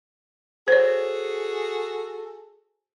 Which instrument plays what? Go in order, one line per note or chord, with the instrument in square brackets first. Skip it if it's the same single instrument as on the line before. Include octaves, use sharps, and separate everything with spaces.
[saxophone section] F#4 G#4 A4 [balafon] C5 C#5